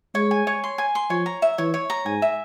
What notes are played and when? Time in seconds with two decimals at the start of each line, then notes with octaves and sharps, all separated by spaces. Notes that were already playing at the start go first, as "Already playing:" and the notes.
0.15 G#3 C#5
0.31 G#5
0.47 C#5
0.64 C6
0.78 G#5
0.95 C6
1.10 F3 C#5
1.26 A#5
1.42 E5
1.58 E3 C#5
1.74 C#5
1.90 A#5
2.05 G#2 G#5
2.22 E5